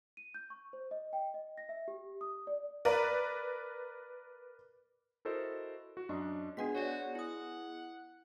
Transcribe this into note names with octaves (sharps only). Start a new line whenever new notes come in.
D#7
G6
C#6
C5
D#5
G5
D#5
A#6
E5
G4
D#6
D5
A#4 B4 D5
E4 F#4 A4 A#4 C5 D#5
F#4
F#2 D4 D#5 C#6
G#3 B3 D4 G#4 F#5 B6
F#4 C#5 D5
E4 F#5 D#6